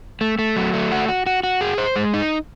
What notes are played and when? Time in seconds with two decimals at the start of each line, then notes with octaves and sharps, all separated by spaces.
0.21 A3
0.39 A3
0.56 F#3
0.74 A3
0.92 F#4
1.08 F#4
1.26 F#4
1.43 F#4
1.61 G#4
1.78 C5
1.96 G#3
2.14 D#4